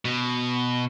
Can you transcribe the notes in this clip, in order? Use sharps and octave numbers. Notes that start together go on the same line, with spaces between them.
B2